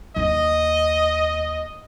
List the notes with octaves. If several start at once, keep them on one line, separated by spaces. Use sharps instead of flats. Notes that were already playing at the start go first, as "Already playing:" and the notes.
D#2 D#4 D#5